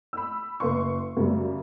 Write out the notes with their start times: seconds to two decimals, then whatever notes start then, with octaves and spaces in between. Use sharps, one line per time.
0.13 B5 E6
0.60 F#1 B4 C6 C#6
1.17 F#2 C#3 G3